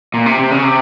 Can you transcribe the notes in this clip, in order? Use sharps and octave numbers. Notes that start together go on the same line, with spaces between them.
A#2
C3
C3
C#3
C3